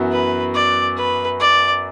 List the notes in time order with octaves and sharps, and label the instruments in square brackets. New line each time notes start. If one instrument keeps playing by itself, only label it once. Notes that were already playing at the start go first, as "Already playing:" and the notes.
Already playing: [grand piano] F#2 E3 B3 F#4
[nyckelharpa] B4
D5
B4
D5